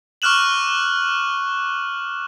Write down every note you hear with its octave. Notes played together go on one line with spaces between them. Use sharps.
C#6 D6 F6 F#6 E7 F#7